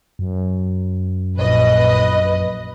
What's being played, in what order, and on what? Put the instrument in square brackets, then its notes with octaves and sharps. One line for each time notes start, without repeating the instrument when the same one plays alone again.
[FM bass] F#2
[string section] A#1 B4 D#5